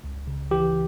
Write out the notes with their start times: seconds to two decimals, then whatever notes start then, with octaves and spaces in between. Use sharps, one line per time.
0.04 C#2
0.27 C#3
0.51 E3 G4